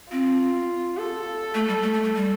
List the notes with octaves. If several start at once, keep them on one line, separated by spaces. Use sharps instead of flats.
C4 F4
A4
A3
G3
A3
A3
A3
G3